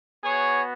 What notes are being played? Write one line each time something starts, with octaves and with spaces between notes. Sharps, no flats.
B3 F#4 G#4 C#5